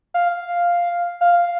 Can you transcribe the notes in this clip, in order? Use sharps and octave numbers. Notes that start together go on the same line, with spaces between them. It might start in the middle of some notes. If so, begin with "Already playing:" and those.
F5
F5